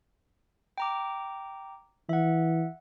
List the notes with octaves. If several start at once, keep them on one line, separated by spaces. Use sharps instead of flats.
G5 A#5 D6
E3 E5 F#5